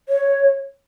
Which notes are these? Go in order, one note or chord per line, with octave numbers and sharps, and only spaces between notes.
C#5